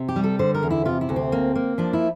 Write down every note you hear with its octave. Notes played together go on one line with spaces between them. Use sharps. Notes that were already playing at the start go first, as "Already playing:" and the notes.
Already playing: C3
G4
G3
A4
D3 C5
A#4
E2
E4
C3 F4
E4
D2
C4
A#3
A#3
F3 D4
E4